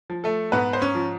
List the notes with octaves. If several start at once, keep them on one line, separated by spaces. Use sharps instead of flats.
F3
A3 A4
G#2 B3 B4
C5
C#4 C#5
F3